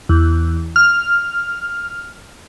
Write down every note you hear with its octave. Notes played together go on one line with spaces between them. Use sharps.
E2
F6